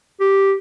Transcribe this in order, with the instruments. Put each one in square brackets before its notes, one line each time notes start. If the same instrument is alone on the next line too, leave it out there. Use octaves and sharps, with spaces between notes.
[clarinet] G4